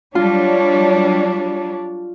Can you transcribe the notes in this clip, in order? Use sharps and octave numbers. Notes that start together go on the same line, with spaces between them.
F#3 G3 D4 F4 C#5